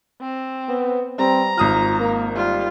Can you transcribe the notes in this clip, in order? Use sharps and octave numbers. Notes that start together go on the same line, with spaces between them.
C4
B3
G3 C4 A#5
G#1 F4 D#6 F6
A#3
G3 F4